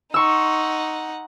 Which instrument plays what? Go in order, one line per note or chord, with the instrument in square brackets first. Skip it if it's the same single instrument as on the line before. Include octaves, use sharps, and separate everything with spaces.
[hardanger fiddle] D#4 F#5 [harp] C6 C#6 E6